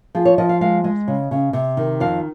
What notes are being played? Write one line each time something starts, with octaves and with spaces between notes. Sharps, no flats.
F3 G#4
C#5
F3 D#5
F5
G#3 F5
G#3 D#5
C#3
C#3
C3
D#3
F2 F5